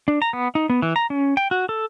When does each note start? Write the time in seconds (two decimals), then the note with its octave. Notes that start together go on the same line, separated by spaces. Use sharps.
0.08 D4
0.22 A#5
0.33 B3
0.55 D#4
0.70 B3
0.82 E3
0.96 A#5
1.10 C#4
1.37 G5
1.51 F#4
1.69 A4